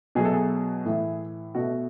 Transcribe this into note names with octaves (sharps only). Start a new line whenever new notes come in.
B2 F#3 A3 G#4
A4
G#4
A2 E3 A3
B2 A3 F#4